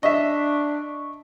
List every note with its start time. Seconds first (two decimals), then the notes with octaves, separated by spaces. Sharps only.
0.03 D4 D#5 E5 C#6